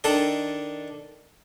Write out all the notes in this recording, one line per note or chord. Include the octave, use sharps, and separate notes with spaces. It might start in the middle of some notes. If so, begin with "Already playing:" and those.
D#3 D4 A4 D#5